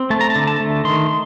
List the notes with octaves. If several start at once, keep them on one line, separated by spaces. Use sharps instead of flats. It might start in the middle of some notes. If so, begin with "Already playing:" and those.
Already playing: C4
A3 A5
A#5
A5
D3
A5
A3
D#3 C6